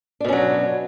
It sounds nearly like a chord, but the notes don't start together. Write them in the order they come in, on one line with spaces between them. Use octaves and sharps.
D4 B2 C#4 F#3